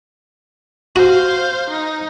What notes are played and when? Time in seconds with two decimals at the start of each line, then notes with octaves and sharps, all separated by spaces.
0.96 F#4 C5 F5
1.70 D#4